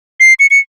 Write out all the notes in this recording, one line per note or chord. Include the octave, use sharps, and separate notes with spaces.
C7
C#7
C#7